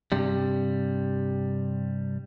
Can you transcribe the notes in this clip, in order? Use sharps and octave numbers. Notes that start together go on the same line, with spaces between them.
G2 C3 G3